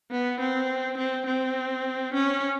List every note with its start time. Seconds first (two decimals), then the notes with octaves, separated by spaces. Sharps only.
0.11 B3
0.40 C4
0.98 C4
1.26 C4
2.14 C#4